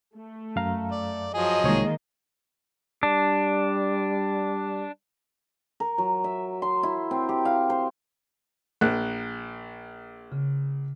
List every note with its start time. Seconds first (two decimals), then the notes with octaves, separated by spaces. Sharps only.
0.15 A3
0.56 F#2 F5 A#5
0.91 D5
1.34 F3 F#3 G#4 D#5
1.64 C2 D#3 G#3 A#3 C#5
3.03 G3 D4
5.80 A#4
5.98 F#3
6.24 E5
6.62 C6
6.83 E4
7.11 C4
7.29 G4
7.45 F5
7.70 C5
8.81 A#1 F#6
10.32 C#3